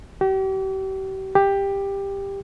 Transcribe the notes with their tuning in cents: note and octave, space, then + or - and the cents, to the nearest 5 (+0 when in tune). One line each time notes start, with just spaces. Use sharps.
G4 -40
G4 +10